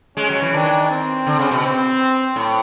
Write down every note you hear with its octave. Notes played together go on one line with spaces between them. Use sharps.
G#3 C#4
F#3
E3
D#3 D4
C4
D3
C#3
B2
C4
A2